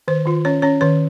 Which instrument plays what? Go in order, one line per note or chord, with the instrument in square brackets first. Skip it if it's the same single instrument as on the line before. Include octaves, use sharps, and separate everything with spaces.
[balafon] D#3 C5
D#3 F4
C#4 C#5
C#4 C#5
D#3 C#5